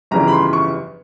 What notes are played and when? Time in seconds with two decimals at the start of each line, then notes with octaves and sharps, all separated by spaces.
0.11 G1 F2 C#3 E3 G3 A#5
0.28 B5
0.33 C6
0.53 C#6